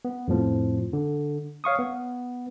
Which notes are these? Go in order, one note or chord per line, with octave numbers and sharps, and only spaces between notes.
B3
F2 A2 F3
D3
C#5 F5 C#6 D#6
B3